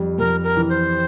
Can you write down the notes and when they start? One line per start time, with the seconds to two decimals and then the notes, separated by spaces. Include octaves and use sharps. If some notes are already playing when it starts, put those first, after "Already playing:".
Already playing: F2 G3
0.19 F2 A#4
0.43 A#4
0.57 E3
0.69 C5